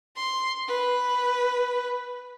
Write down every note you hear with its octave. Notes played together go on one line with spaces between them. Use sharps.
C6
B4